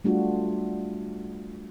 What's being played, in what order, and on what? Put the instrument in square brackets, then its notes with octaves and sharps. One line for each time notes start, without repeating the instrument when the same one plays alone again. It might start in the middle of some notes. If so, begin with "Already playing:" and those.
[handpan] G3 A3 D4 F4 F#4